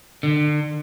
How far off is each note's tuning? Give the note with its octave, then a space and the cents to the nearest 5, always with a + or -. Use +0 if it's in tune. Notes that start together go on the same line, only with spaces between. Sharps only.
D3 +35